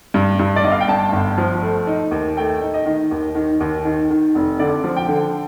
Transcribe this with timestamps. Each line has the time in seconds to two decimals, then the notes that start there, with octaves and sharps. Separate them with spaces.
0.14 G2
0.39 G2
0.56 D5
0.64 G1 D#5
0.72 F5
0.81 G5
0.88 G2 A5
1.12 G1
1.38 F3
1.62 A3
1.87 D#4
2.11 D#2
2.37 A3 G5
2.62 D#4
2.74 D#5
2.86 D#3
3.11 D#2
3.35 D#3
3.61 D#2
3.85 D#3
4.11 D#3
4.35 F1
4.59 D3 D5
4.84 F3
4.96 G5
5.08 D3